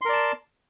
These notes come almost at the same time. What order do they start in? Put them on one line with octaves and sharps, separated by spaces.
C6 A#4 D5 A5